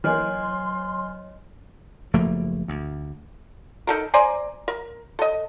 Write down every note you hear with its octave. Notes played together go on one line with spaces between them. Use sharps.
E3 F#3 A#3 C#5 D#5 G#5 C6 F6
F#1 F3 A3 A#3
D2
D#4 A4 A#4
C5 D5 G#5 A#5
A#4
A4 D#5